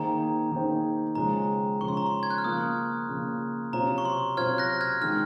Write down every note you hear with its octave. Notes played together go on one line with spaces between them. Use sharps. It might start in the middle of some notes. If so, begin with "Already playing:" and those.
Already playing: D#3 A#3 D#4 G#4 C5 A#5
D#3 A#3 D#4 G#4 C5
C#3 F3 G#3 C#4 A#5
C#3 F3 G#3 C#4 C#6
C6
A#5
C6
G#6
F#6
F6
C#3 F3 A#3 D#6
C#3 F3 A#3
C3 F#3 C#4 F4 C5 A#5
C#6
C6
C3 F#3 C#4 F4 C5 F6 G#6
F#6 A#6
F6 G#6
D#3 G#3 D#4 F6